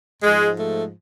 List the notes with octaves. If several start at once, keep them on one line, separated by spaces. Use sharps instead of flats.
G#2 F3 G#3
A3